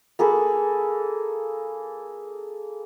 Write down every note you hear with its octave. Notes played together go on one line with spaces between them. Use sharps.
A#3 G#4 A4 B4